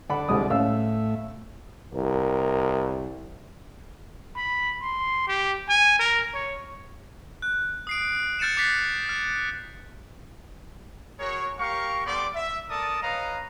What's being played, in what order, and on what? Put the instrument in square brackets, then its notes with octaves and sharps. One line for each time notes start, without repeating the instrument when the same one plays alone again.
[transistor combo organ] D3 A4 D5 [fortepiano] F#5 B5
[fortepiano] C2 G#3 D#6
[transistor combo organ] A2 A3 E5 [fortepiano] C#4 F5 E6
[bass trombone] C2 [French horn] A#4
[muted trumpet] B5
C6
G4
G#5
A#4
C#5
[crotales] F#6
D#6 C7 D7
F6 G6 A6 C#7 D#7 E7
D6 F6 F#6 A6 B6 C7
F6 G6
[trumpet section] F#4 G#4 A#4 C#5
G4 A#4 F5 C#6
G3 B3 A4 D5 C6 D6
E5
A4 A#4 D5 A5 D#6
B4 C#5 D#5 F5 A#5